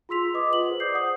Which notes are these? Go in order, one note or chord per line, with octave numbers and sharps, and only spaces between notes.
F4 G#4 C6 E6 B6 F7
B4 D#5 D6 D#6
F4 F#5 F#7
G#4 C5
C5 D5 D6 D#6 G6 C7
F#5 D#6